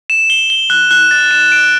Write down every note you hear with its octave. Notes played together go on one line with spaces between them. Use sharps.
E7
G7
G7
F#6
F#6
A6
E7
D7